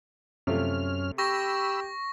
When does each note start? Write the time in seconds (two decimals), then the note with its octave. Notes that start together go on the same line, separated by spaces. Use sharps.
0.47 F#2 C3 A3 C#4 F4 F6
1.18 G4 B5 C#6 E6 A#6